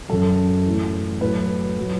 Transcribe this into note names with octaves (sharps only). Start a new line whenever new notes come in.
F#2 F#3 A4
A2 E3
A2 F#3 B4
F#3